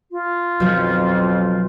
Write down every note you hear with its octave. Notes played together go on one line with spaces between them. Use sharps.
F4
B1 F2 F3 C#4